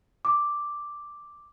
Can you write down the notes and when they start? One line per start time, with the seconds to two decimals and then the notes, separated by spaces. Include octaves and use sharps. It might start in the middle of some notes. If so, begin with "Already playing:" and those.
0.25 D6